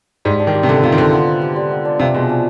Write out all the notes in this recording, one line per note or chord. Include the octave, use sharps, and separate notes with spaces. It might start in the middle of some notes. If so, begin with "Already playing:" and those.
G#2 G3
D4
D#3
G4
C3
D3 B3
C3 F4
D#3
D3 C5
B3
D#4
G4
G3
B3
D4
C3 F3
B2 G#3
D4